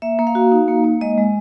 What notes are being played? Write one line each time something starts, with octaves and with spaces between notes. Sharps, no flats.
A#3 E5
A#3
F5
F#4
D#4
A#3
A#3
G#3 D#5
G#3